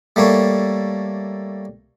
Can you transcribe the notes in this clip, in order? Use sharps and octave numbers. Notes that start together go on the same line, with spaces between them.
G3 A3 A#3 C#5